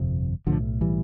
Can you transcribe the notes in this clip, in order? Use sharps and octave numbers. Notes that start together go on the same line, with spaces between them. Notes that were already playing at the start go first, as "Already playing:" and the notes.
Already playing: G1 F2 C3
B1 A2 D3 F3
E3 G3